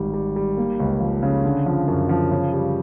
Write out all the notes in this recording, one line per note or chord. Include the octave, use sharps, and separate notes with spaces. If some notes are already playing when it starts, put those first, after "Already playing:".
Already playing: G#1 G3
G3
G3
A#3
C#2
F3
C#3
D3
F3
F#2
F3
C#3
G3